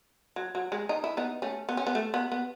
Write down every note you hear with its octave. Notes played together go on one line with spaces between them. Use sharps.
F#3
F#3
G#3
D#4
E4
B3 D#4
A3 C#4
B3
C#4
B3
A3
B3
B3